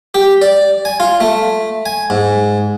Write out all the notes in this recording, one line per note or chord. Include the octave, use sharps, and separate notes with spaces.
G4
D5
G#5
F4
A3
G#5
G#2